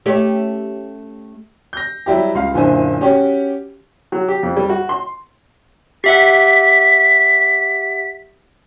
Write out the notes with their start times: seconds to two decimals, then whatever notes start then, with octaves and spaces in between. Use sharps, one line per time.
0.06 A3 C#4 G4
1.73 G6 A#6
2.06 F#3 G3 E4 G4
2.35 C#2 F5
2.54 F#1 A#2 D3 E4 C5 G#5
3.01 C#4 F#4 G4 C#5
4.12 F#3
4.28 G4
4.43 F2
4.57 G3
4.69 F#4
4.89 C6
6.04 G4 E5 F#5 B6